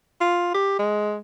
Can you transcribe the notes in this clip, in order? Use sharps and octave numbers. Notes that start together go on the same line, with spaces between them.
F4
G4
G#3